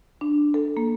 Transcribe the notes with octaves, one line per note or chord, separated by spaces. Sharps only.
D4
A4
A#3